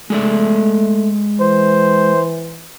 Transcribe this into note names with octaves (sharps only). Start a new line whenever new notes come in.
G#3 A3 D5 E5
E3 C5